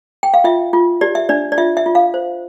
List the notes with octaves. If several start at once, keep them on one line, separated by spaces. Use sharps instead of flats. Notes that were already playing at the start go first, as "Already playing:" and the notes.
G5
F5
F4 E5
F4
G4 D5
E5
D4 D5
D5
F4 E5
E5
F4
F5
C5